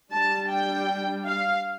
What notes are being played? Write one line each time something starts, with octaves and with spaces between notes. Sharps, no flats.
G3 D4 A5
G5
F5